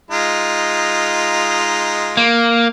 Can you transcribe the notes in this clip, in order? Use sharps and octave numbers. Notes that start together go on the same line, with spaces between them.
G#3 D#4 F4
A#3